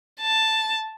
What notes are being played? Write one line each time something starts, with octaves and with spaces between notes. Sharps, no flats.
A5